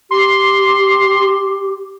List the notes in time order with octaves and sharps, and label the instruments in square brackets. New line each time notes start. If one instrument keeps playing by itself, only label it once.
[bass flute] G4 [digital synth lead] C6